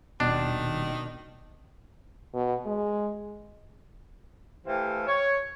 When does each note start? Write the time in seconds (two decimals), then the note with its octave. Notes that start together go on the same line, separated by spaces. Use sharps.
0.20 D#1 B2 D#3 D4
2.34 B2
2.66 G#3
4.66 E3 A3 G4 C5 F5
5.07 C#5